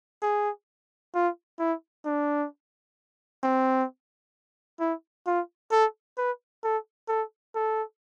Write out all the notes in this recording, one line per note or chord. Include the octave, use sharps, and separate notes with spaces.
G#4
F4
E4
D4
C4
E4
F4
A4
B4
A4
A4
A4